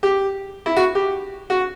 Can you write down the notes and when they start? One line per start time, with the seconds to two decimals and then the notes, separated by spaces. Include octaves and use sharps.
0.03 G4
0.66 E4
0.76 F#4
0.95 G4
1.50 F#4